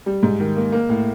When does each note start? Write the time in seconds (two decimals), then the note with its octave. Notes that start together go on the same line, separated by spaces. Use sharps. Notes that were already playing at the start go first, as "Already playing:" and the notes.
0.06 G3
0.23 G#2
0.40 D#3
0.56 A#3
0.72 A#3
0.89 A2